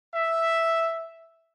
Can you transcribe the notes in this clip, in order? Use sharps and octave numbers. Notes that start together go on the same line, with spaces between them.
E5